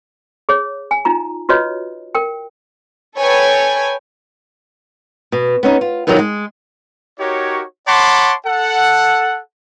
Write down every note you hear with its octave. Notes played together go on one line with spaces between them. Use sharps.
G#4 C#5
G#5
D#4 F4 A#5
F4 F#4 B4 C#5 D#5
A#4 G5
A4 B4 C#5 G5 G#5
B2
B3 C#4 D#4
F4
B2 D3 D#3 F3 F#3
G#3
D#4 F#4 G4 A#4 C#5
C#5 F#5 A5 B5 C6 D6
A4 F#5